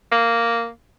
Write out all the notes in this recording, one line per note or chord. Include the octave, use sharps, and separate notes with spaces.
A#3